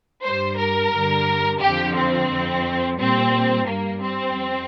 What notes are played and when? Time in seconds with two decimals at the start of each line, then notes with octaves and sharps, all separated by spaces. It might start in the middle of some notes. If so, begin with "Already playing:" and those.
0.24 G2 G3 C5
0.58 A#4
0.93 G2 D3 G3
1.61 F2 D3 F3 G4
1.96 C4
2.31 F2 F3
2.98 A#2 G3 C4
3.67 G2 G3 A#3
4.02 C4
4.35 F2